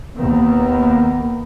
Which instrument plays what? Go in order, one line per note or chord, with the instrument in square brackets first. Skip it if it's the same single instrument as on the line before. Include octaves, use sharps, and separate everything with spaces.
[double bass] D#2 D#3 [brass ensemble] A#3 B3